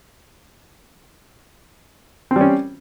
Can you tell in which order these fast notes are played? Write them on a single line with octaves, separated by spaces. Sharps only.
C4 G3 C#4